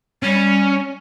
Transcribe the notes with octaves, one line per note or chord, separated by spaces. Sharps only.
G3 C#4